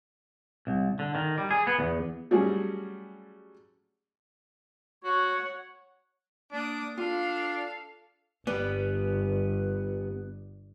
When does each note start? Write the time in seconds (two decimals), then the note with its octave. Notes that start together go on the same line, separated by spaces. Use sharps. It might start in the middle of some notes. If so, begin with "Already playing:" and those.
0.67 C2
0.99 D3
1.15 D#3
1.38 G3
1.51 G#4
1.67 B3
1.79 E2
2.31 F#3 G3 A3 C#4 F#4 G#4
5.04 F#4 C#5 F#5
6.52 A#3 D4 D6 D#6
6.97 D4 F4 A4 F5
8.47 G1 G3 B3